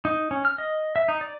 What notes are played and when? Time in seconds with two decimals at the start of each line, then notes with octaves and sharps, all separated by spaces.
0.05 D#4
0.31 C#4
0.45 F6
0.58 D#5
0.96 E5
1.08 D#4
1.21 D5